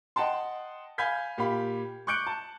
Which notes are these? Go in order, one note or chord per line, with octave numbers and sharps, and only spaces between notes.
D#5 F#5 G5 A5 C6
F5 G#5 B5 G6 G#6 B6
A#2 G4 F5 B5
C#6 D6 F#6 G6 C#7 D7
A5